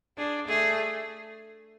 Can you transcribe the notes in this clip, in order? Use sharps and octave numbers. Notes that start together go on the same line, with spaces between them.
D4 G#4
A3 G#4